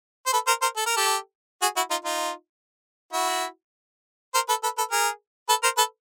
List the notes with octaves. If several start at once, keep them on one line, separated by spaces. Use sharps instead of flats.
C5
A4 B4
A#4 C5
A#4 C5
A4
A#4
G4 A4
F#4 G#4
E4 F#4
D#4 F4
D#4 F4
E4 F#4
A#4 C5
A4 B4
A4 B4
A4 B4
G#4 A#4
A4 B4
A#4 C5
A4 B4